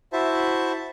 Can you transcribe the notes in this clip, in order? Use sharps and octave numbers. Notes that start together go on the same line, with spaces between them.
E4 F#4 C5 E5 A5